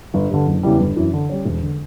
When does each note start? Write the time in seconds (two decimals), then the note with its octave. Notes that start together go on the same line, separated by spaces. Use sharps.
0.14 G1
0.30 G2 D3
0.46 F#1
0.63 E2 C#3 E3 G3
0.80 G1
0.96 F#2 E3
1.13 D3
1.29 G3 C#4
1.45 E1
1.62 D3